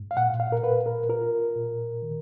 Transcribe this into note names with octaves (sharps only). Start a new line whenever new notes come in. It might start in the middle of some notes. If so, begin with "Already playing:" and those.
Already playing: G#2
F5
A#2 F#5
F5
A#4
A#2 B4
A#4
F4 A#4
A#2
D#3